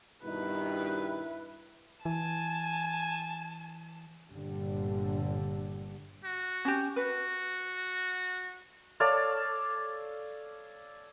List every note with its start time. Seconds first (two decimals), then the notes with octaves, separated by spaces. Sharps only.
0.24 G2 B2 D#3 E4 B4
2.05 E3 G#5 A5
4.28 G1 G2 A#2 D3 G3
6.24 F#4
6.65 C#4 G4
6.96 F#4 B4
9.00 A4 C#5 D5 F5